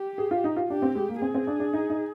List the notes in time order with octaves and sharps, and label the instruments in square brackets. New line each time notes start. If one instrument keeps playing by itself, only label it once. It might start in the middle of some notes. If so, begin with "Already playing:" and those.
Already playing: [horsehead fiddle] G4
[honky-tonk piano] G#4
F4
D#4
F4
[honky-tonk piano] D4 [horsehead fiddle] G4
[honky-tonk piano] C4
G#3
A#3
[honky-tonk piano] C4 [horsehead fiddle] G#4
[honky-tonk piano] C4
D4
D4
D#4
D#4